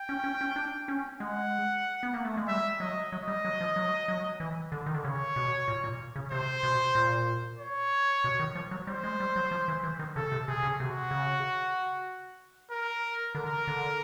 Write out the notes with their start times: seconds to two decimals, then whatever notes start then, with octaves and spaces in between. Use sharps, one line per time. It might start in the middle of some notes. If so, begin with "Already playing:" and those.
Already playing: G5
0.09 C#4
0.24 C#4
0.41 C#4
0.56 D4
0.88 C#4
1.20 G#3 F#5
2.03 B3
2.14 A#3
2.25 A3
2.37 G#3
2.48 G3 E5
2.80 F#3 D#5
3.11 F#3 D#5
3.28 G3
3.45 F#3
3.61 F3
3.76 F#3
4.08 F#3
4.40 E3
4.72 D3
4.86 D#3
4.95 D3
5.03 C#3 C#5
5.36 B2
5.68 A#2
5.84 A#2
6.16 C#3
6.32 C3 C5
6.63 B2
6.95 A#2
7.59 C#5
8.24 B2
8.40 D#3
8.55 F3
8.71 F#3
8.87 G3 C5
9.04 G#3
9.20 G3
9.36 F#3
9.51 F3
9.68 E3
9.84 E3
9.99 D#3
10.16 C#3 A4
10.32 C3
10.48 C3 G#4
10.63 C#3
10.79 C3 F#4
11.11 C#3
12.71 A#4
13.35 D3 A#4
13.67 D3